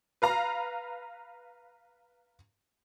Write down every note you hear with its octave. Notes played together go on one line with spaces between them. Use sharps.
B4 F5 A#5